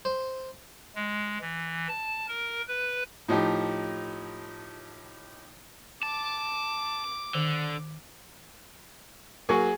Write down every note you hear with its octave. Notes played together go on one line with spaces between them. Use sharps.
C5
G#3
E3
A5
A#4
B4
A2 F3 D#4 G4
A5 D6
D3 D#3
F#3 A#3 G#4 G#5 C#6